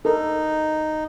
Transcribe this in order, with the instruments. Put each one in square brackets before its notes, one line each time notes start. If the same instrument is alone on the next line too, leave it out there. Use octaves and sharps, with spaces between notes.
[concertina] D#4 [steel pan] A4 A#4